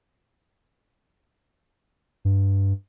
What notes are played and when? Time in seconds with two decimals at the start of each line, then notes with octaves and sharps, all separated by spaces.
2.25 G2